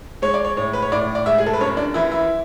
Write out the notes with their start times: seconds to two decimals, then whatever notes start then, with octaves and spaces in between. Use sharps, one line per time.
0.22 G#3 C#5
0.34 D5
0.45 C#5
0.57 A2 C#5
0.73 B4
0.82 C#5
0.92 A2 D5
1.15 D5
1.26 G#3 E5
1.38 G#4
1.46 A4
1.53 B4
1.60 F#2 C#5
1.77 D4
1.94 E3 E4
2.12 E4